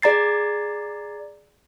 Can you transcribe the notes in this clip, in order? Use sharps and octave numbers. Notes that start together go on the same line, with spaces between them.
G#4 D5 A#5 A6 C7